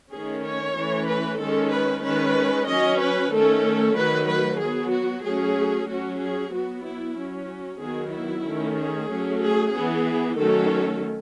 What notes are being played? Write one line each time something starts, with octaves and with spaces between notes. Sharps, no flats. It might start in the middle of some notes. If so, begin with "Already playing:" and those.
D#3 A3 C#4 G#4
C#5
E3 A3 C#4
B4
D#3 G#3 C#4 A4
B4
D#3 G#3 C#4 B4
F#3 C#4 D#5
B4
D#3 A3 C#4 A4
D#3 F#3 A3 B4
B4
F#3 B3 G#4
F#4
F#3 A3 C#4 G#4
F#3 C#4 F#4
G#4
F#3 B3 F#4
E4
F#3 C#4
D#3 F#3 B3 G#4
E4
D#3 A3 C#4
G#4
F#3 A3 C#4
G#4
E3 B3 G#4
D#3 F#3 A3 C#4 A4